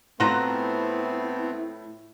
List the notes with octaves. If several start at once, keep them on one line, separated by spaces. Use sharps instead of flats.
A2 F3 A3 B3 C4 E4 F#4 A#5